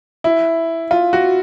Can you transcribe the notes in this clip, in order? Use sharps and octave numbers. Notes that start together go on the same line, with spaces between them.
E4
F4
F#4